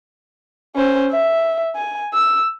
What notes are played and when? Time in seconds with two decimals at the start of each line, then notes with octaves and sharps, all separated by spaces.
0.75 C#4 C5
1.11 E5
1.76 G#5
2.14 E6